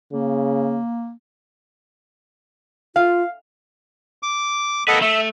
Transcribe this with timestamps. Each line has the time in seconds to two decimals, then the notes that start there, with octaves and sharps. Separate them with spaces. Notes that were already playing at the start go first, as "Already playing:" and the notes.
0.13 C#3 A#3
2.96 F4 F5
4.23 D6
4.88 A#3 A4 B4 D#5 F#5
5.02 A3 E5